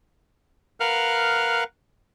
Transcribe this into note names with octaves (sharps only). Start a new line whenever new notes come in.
A#4 B4 F5 F#5 F6 F#6